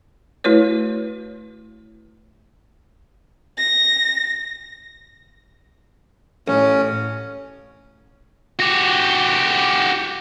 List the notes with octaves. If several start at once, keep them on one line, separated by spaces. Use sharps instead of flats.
A3 E4 F#4 B4 C#5
A#6
A1 C#4
F#4 G4